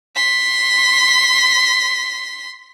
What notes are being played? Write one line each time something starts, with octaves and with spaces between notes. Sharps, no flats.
C6 B6